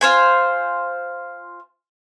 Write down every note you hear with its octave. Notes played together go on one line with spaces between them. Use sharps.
F4 C5 G#5